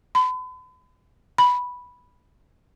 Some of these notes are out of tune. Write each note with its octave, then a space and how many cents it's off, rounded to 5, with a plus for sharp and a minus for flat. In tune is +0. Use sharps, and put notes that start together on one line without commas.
B5 +40
B5 -5